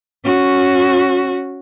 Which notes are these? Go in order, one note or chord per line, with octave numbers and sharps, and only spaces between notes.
C#4 F#4